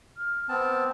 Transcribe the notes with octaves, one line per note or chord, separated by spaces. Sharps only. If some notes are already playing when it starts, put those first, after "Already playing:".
F6
B3 C4 A5